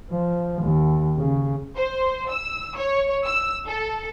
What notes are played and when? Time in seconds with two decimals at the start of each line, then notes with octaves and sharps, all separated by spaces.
0.11 F3
0.63 D#2
1.17 C#3
1.77 C5
2.29 E6
2.76 C#5
3.25 E6
3.68 A4